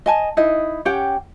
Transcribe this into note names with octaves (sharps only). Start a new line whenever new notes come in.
D#5 G#5 A5
D#4 E4 D#5
C#4 G4 F#5 G5